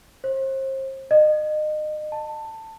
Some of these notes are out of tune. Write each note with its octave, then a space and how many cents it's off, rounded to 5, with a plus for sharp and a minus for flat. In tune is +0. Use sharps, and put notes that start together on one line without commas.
C5 +35
D#5 -30
A5 +15